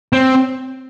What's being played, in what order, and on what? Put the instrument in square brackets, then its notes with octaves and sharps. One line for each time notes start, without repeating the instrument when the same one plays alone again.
[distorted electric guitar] C4